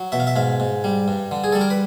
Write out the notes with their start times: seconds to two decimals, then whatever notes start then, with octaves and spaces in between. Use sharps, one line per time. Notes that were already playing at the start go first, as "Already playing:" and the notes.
Already playing: F#3
0.12 B2 E5
0.20 F5
0.27 E5
0.36 G#2 F5
0.60 G#2
0.84 G3
1.08 G2
1.31 D3
1.44 G#4
1.52 G3 A4
1.61 A#4
1.70 B4